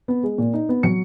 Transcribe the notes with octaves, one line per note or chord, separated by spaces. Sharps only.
B3
G#3
A#2
D#4
B3
F#3 C#7